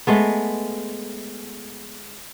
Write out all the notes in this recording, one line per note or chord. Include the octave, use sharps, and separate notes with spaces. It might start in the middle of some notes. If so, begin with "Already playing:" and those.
G#3 A3 B3